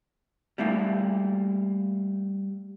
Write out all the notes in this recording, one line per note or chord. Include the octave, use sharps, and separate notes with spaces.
G3 A3 A#3 E4